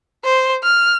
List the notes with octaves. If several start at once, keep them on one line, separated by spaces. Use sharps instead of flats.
C5
F6